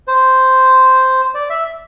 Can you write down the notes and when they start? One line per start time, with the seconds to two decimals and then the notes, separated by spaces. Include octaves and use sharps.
0.08 C5
1.34 D5
1.50 E5